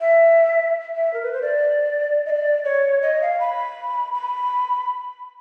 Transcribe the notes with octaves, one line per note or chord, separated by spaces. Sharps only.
E5
E5
A#4
B4
C5
D5
D#5
D5
C#5
D#5
F5
B5
B5